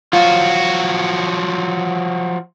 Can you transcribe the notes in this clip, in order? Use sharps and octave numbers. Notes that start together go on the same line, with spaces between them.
F3 F#3 F4 F#4